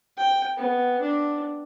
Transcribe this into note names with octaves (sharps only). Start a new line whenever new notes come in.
G5
B3
D4